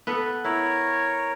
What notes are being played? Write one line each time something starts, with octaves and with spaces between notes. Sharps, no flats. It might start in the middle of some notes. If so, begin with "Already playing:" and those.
B3 A4 B4
E4 A#4 C#5